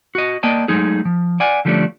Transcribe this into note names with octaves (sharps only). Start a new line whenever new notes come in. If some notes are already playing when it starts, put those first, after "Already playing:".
F#4 D#5
A#3 D5 D#5 G5 A5
F#3 G#3 A3 D#4 G#4
F3
D5 F#5 G#5
D3 F3 G3 A3 C#4 D4